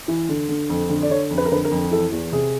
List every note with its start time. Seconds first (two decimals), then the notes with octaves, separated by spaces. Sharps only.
0.08 E3
0.29 D3
0.49 D3
0.69 F2
0.90 D3
1.02 D5
1.10 D3 C#5
1.31 F2
1.38 B4
1.45 A#4
1.52 D3 B4
1.65 A#4
1.71 F2
1.91 E3 A4
2.12 E2
2.32 C3 G#4